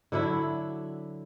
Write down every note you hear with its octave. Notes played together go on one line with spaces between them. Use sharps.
D3 F#3 D4 E4